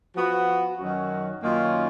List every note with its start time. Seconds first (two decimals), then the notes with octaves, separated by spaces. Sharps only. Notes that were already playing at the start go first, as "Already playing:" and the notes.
0.15 F3 B3 F#4
0.78 F#2 D#3 F#3 C#4 F#4
1.42 F#2 D#3 A#3 C#4 F4